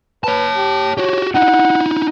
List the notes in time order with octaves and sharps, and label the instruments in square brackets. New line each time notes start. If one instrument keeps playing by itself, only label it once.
[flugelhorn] B4 [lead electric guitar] C#5 A5
[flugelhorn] G4
[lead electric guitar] F#4 G4 [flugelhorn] C#5
[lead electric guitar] D#4 E4 [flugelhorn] F#5